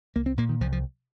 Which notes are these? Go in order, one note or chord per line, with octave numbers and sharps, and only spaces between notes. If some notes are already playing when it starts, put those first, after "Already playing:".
C2 A#3
C4
A#2 A#3
D#3
C2 F3
F3